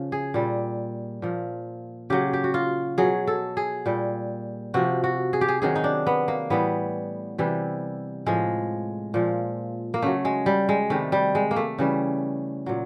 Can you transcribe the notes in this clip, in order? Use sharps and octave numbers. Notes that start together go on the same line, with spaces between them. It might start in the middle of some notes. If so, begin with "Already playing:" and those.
Already playing: C#3 F3
G#4
A#2 G3
A#2 F3
C#3 F#3 G4
G4
F#4
F4
B2 F#3 G#4
A4
G#4
A#2 G3
C3 F3 F#4
F#4
G#4
G4
G#4
C3 D#3 F#3 G#4
D#4
D4
B3
A#3
A2 E3 G3 B3
C3 E3 G3
A2 F3 G#3
A#2 F3
A#3
C#3 F#3 A3
G#3
G3
G#3
C3 D#3 G3 A3
G3
G#3
A#3
A3
C#3 E3 G3
A#2 F#3